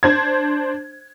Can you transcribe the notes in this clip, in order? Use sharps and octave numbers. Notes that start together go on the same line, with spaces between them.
D4 C5 G#6